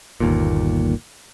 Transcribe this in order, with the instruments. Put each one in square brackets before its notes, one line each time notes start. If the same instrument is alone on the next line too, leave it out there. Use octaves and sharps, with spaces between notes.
[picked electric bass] G1 D#2 A#2